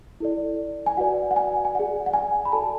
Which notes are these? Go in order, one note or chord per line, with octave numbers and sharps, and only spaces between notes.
E4 A4 D5
G#5
F#4 B4 D5 F#5
F#5
G#5
G#5
G#4 D5 F#5
F#5
G#5
B5
F#4 A4 D5 A5